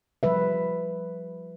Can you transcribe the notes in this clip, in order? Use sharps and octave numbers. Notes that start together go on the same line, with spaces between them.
F3 G3 B4 E5